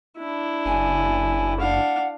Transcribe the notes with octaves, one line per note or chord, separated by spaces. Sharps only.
D4 E4
F#1 G#5
D4 F5 F#5